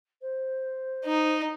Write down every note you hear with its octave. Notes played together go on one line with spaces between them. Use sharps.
C5
D#4